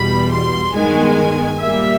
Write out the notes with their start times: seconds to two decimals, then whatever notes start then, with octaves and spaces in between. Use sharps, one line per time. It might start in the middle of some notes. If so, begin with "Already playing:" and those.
Already playing: E2 B2 G3 B5
0.32 C6
0.75 G2 D#3 G#3 B3 G#5
1.61 A#2 G3 A#3 E5